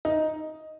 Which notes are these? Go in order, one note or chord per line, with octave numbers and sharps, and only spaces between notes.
D#4